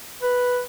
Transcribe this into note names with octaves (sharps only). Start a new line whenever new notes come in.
B4